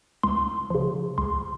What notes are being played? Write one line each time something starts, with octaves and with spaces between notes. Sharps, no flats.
C#2 C6
C#3 F3
C#2 C6